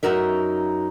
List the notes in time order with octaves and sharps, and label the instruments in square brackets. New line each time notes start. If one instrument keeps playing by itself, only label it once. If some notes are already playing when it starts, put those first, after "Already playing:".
[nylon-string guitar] F#2 D#4 F#4 A#4 E5